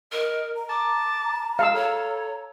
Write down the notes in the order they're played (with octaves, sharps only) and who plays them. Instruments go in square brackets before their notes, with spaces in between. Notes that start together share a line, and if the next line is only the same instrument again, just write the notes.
[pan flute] A#4 [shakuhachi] D#5
[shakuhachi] A#5
[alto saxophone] A5 [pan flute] D6
[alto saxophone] G#3 [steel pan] F5 E6 [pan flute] A5
[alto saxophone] A4 [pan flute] C#5